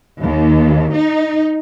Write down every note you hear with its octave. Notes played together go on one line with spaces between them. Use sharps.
D#2
D#4